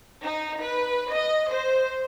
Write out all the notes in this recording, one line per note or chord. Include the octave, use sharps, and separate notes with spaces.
D#4
B4
D#5
C5